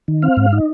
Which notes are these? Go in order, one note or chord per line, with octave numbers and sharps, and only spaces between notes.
D#3
C4 F5
G#2
D#4